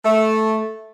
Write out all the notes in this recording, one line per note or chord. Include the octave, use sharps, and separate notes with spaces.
A3